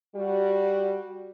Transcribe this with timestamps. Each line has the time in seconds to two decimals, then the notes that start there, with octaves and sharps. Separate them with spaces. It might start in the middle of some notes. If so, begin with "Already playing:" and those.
0.14 G3 F#4